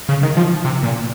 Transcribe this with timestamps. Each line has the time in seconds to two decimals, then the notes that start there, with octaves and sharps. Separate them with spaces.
0.09 C#3
0.23 D#3
0.37 F3
0.65 C3
0.83 A#2